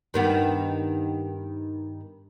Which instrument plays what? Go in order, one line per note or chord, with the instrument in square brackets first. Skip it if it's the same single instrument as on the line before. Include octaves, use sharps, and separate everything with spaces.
[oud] G2 D#3 B3